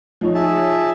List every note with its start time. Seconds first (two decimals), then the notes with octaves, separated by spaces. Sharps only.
0.21 F3 D#4 C#5
0.35 G#4 E5 A5